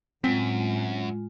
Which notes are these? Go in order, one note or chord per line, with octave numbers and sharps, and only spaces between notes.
F#2 A2 G#3 C4 F4